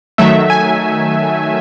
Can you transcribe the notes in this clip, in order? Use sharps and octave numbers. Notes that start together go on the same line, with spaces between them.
D#3 F#3 A3 E5
G#5